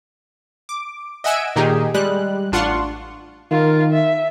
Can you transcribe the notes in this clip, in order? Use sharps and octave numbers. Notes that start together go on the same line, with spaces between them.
D6
D#5 E5 F#5 G#5 E6 D7
A#2 D#3 D#4 G4 G#4
G3 G#3 F#6
A1 D4 F4 F#5 C6 C#6
D#3 F4 A#4
E5